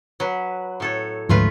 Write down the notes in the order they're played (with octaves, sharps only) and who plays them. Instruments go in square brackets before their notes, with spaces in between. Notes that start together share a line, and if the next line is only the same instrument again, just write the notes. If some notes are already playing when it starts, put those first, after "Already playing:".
[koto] F#3 B4
A2 A4 C#5
[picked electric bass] D2 G#2 F3 [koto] A3 F4 B4